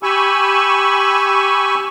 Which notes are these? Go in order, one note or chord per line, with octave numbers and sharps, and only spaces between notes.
G4 G#5 B5 C#6 E6